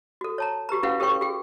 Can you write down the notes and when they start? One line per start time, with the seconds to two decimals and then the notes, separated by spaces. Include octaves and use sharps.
0.21 F#4 A4
0.38 C#5 A5 A#5
0.69 F#4 G4 B4 A#5
0.83 C#4 E4 F#4 B4 F5 F#5
1.00 G4 A4 B4 C#5 G5 C#6
1.21 F#4 G#4 G5